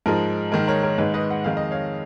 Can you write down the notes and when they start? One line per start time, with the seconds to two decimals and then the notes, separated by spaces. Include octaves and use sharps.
0.06 G#2 F3 G#3 A#4
0.52 G#2 D#3 G#3 A#4
0.68 A#4 C#5
0.83 A#4 C#5
0.98 G#2 D#3 G#3 G#4 B4
1.14 B4 D#5
1.31 F#5
1.44 F2 D#3 G#3 F5
1.57 D#5
1.71 C#5 F5